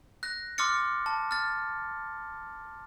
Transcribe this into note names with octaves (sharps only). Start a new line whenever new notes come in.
F#6 A#6
C6 D6 E6 F6 A6 C#7
A5
F6 A6